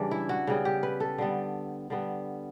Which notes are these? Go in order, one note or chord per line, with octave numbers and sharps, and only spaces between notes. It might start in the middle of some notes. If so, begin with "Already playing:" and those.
Already playing: C#3 E3 G3 D4
E4
F#4
C#3 G3 B3
G4
B4
A4
D3 G3 B3
D3 G3 B3